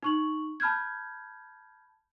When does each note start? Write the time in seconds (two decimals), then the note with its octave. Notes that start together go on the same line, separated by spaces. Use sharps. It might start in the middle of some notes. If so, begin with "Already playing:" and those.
0.03 D#4 C#6 F#7
0.60 A5 B5 F6 G6 G#6